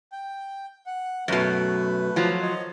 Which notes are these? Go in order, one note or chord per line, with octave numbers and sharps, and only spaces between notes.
G5
F#5
F#2 B2 A3 B4
F3 F#3
C#5 D#5